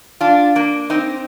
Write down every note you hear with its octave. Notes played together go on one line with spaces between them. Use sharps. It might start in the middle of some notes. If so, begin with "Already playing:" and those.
D4 F4
A#3 D4
C4 D#4